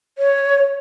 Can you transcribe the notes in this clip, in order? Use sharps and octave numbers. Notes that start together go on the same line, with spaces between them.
C#5